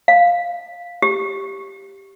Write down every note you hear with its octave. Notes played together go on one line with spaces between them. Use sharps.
F5
G4